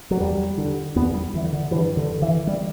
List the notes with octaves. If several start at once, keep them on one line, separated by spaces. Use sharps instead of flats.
F#3
E2 G3
D3
E2 B3
G3
D3 E3
D3
G2 E3
D3
D3
E3
G3